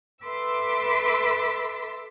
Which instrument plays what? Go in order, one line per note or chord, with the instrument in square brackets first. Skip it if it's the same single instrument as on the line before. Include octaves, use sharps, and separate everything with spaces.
[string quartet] A4 B4 E5 C6 D6 E6